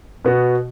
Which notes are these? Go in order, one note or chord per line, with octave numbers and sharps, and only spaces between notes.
B2 B3 F#4